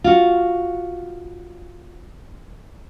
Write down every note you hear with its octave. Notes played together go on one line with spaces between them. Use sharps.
F4 F#4